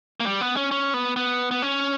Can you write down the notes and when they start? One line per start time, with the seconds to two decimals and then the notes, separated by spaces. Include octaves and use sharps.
0.20 A#3
0.26 G3
0.41 B3
0.57 C#4
0.71 C#4
0.94 B3
1.16 B3
1.51 B3
1.62 C#4